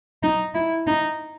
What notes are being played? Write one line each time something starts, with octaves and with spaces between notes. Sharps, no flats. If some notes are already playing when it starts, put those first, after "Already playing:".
D#4
E4
D#4